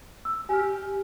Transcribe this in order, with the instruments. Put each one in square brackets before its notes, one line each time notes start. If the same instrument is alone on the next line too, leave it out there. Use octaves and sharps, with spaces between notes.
[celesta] E6
[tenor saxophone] G4 [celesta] G#5 F6